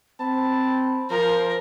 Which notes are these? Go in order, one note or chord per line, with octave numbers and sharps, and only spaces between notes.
C4 A5 B5
F3 A#4 C5 A#5